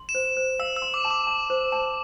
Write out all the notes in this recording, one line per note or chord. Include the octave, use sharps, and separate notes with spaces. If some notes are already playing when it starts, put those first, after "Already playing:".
Already playing: C6
E7
C5
C5
F5 E6
E6
C6
D6
A5
D6
A5
C5
A5